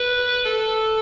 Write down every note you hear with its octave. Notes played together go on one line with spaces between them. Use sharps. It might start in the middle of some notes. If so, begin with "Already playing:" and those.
Already playing: B4
A4